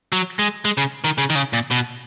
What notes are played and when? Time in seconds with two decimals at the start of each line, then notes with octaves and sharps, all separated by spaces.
0.12 F#3
0.39 G#3
0.65 G#3
0.78 C#3
1.04 D#3
1.18 C#3
1.30 D#3
1.35 C#3
1.53 A#2
1.71 B2